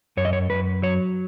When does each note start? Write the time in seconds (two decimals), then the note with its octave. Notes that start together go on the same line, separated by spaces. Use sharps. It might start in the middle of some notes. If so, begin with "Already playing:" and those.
0.17 F#2 C#5
0.25 D#5
0.33 C#5
0.50 F#2 B4
0.82 F#3 C#5